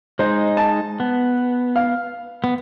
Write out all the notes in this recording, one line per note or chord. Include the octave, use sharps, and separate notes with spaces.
G#3 D#4 C5
A5
B3
F5
B3